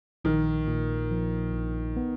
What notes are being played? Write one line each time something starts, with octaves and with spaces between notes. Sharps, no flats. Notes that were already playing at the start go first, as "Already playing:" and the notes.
A#1 D#3
A#2
F3
A#1
B3